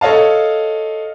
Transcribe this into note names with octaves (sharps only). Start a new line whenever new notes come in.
A4 C#5 D#5 F5 A5